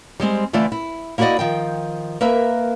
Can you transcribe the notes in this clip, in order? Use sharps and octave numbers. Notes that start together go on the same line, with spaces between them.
G3 G#3 C4 C5
D3 E3 A3 F4 D5
E4
A#3 E4 F#4 G#4 D5 D#5
D#3 F3 G5
A#3 A#4 B4 E5